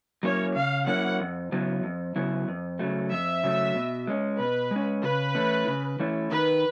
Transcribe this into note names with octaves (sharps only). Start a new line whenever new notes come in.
F#3 A#3 C#4 E4 C#5
C#3 F5
F#3 A#3 C#4 E4 F#5
F2
C#3 F#3 B3 E4
F2
C#3 F#3 B3 E4
F2
C#3 F#3 A3
F2 E5
C#3 F#3 A3
B2
G#3 C#4
B2 B4
G#3 C#4
C#3 B4
E3 A3 C#4 E4
C#3
E3 A3 C#4 E4
D#3 B4